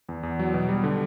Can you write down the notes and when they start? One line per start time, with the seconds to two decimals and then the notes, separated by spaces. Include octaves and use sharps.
0.09 E2
0.23 E2
0.39 F#3
0.54 B2
0.69 G3
0.84 D3